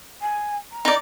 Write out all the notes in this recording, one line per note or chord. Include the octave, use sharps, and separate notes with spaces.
G#5
A#5
D#4 D5